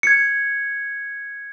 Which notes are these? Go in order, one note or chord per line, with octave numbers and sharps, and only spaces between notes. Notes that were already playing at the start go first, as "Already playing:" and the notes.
G#6 C#7